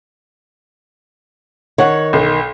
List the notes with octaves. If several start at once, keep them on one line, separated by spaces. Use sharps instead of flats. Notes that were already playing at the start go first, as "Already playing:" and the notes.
D#3 C#5 F#5
B1